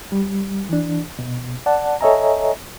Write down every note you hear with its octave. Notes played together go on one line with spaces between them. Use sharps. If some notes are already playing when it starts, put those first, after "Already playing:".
G3
E3 D4
B2
D5 F#5 A5
A4 C#5 D#5 E5 G#5 A#5